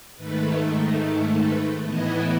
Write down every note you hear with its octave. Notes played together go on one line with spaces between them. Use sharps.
G#2 D#3 A3 B4
A4
B4
A2 E3 B3 E4 D#5